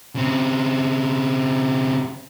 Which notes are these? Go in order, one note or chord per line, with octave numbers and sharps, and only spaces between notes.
C#3 C4